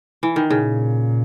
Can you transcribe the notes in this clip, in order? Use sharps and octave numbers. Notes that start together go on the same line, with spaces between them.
E3
D#3
A#2 C#3